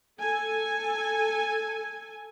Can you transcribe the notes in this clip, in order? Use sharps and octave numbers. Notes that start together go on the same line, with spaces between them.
A4 G#5